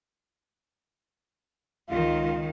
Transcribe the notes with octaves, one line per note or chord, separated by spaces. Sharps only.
C#2 D#3 F4